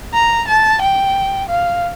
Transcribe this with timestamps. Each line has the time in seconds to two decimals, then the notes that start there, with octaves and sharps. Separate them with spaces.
0.14 A#5
0.48 A5
0.81 G5
1.49 F5